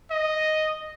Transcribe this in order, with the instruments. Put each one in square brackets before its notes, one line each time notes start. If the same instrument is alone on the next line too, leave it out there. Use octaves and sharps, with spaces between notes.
[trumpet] D#5